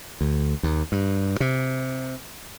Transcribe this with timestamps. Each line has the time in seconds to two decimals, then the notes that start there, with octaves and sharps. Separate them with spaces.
0.21 D2
0.63 D#2
0.92 G2
1.40 C3